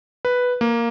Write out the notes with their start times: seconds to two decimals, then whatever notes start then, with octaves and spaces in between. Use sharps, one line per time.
0.25 B4
0.61 A#3